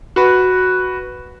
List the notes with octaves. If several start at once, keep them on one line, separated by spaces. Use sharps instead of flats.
F#4 B4